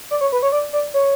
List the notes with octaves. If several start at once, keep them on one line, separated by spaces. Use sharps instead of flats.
D5
C#5
B4
C#5
D5
D5
C#5